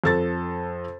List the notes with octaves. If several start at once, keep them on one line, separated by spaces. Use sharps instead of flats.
F2 A4 A6